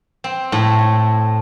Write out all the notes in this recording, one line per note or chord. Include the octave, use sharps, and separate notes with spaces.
C4
A2